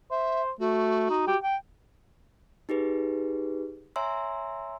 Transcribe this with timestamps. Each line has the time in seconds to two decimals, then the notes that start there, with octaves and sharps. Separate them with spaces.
0.11 C5 E5
0.60 A3 F#4
1.10 D#4
1.27 G4
1.43 G5
2.69 D#4 G4 G#4 B4
3.96 C#5 E5 G#5 A#5 C6 E6